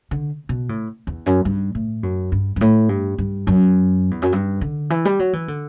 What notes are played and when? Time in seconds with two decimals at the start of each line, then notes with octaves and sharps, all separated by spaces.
0.11 D3
0.49 B2
0.69 A2
1.07 E2
1.26 F#2
1.45 G2
1.75 A2
2.03 F#2
2.32 G2
2.56 G2
2.61 A2
2.89 G2
3.18 G2
3.47 F#2
4.11 E2
4.22 F#2
4.33 G2
4.61 D3
4.90 E3
5.05 G3
5.19 F#3
5.33 E3
5.48 D3